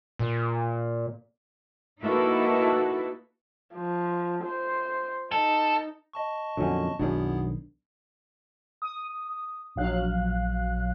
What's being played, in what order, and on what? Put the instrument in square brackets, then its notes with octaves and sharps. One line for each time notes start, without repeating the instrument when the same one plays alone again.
[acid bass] A#2
[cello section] A#3 D#4 E4 F#4 A4 B4
[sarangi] F3
C5
[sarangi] D#4 [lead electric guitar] A4
[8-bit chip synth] D#5 A5 C#6
[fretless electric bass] F2 A#2 D3 [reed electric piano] F#3 C#4
[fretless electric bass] B1 D#3 D4 [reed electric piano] F#2 F#3 [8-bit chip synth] B3 E4 G#4
[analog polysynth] D#6
A#1 F#3 F5 F#6